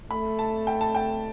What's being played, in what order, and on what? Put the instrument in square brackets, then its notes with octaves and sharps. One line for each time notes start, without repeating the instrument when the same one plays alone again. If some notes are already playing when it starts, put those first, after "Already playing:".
[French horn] A3 [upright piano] B5
[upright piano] A5
G5
A5
G5